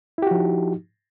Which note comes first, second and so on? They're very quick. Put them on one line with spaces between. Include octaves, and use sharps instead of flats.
E4 G4 F#4 F3 D#4